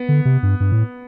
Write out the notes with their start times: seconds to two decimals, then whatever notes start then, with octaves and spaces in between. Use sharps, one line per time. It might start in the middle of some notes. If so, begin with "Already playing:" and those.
Already playing: B3
0.09 D3
0.25 C3
0.43 G2
0.60 G2
0.72 A2